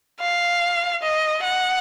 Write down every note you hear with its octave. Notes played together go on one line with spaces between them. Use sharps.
F5
D#5
F#5